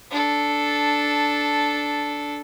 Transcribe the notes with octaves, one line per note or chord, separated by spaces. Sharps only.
D4 A4